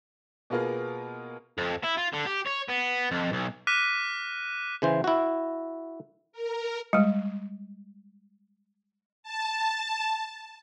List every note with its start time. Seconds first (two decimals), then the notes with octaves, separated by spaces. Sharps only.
0.50 B2 A#3 B3 F4 G#4 A#4
1.58 F2
1.83 E4
1.97 F4
2.13 D3
2.26 G4
2.46 C#5
2.68 B3
3.11 F2
3.32 B1
3.67 D6 F6 F#6 A#6 B6 D#7
4.82 C#3 E3 C5
5.04 E4 F#4
6.32 A#4
6.93 G3 G#3
9.23 A5